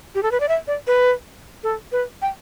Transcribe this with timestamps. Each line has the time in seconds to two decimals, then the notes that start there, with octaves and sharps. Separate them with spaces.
0.15 G4
0.23 A4
0.32 B4
0.40 D5
0.49 E5
0.67 D5
0.87 B4
1.64 A4
1.92 B4
2.22 G5